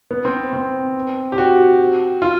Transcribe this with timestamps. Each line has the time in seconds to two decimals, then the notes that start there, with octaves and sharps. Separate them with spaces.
0.11 B3
0.25 C4
0.53 C4
1.32 G4
1.38 F#4
2.22 F4